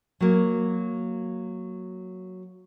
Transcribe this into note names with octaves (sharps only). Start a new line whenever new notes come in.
F#3 A#3